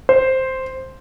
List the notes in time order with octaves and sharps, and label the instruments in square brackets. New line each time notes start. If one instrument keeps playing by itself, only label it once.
[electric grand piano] C5